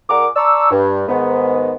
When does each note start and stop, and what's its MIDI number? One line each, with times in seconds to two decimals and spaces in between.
0.10 0.26 46
0.10 0.26 68
0.10 0.26 70
0.10 0.26 74
0.10 0.26 78
0.10 0.26 86
0.36 0.69 74
0.36 0.69 81
0.36 0.69 82
0.36 0.69 85
0.36 0.69 86
0.36 0.69 88
0.71 1.03 43
1.08 1.75 44
1.08 1.75 51
1.08 1.75 59